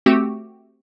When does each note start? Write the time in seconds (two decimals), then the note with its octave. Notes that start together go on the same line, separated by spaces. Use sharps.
0.06 A3 C4 F#4 G4